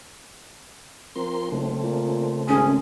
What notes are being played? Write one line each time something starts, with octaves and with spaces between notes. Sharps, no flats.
F3 C4 A#4 C6
F#1 C#3 A3 C4
A#2
G#1 C#4 G#4